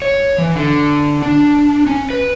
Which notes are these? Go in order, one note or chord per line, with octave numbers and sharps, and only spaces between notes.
C#5
E3
D3
D4
C#4
B4